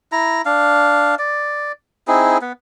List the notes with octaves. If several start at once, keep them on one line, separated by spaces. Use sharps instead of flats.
E4 A#5
D4 F5
D5
C4 D#4 E4 G#4
B3